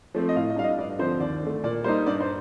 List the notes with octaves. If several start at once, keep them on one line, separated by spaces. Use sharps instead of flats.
F3 A3 C4
D#5
A2 F5
D#5
G3 D4 F5
D#5
G2 D5
D3 F3 C4 C5
D#2 D5
D3 A3
A#2 D5
G3 A#3 D#4 C5
G2 D5
C5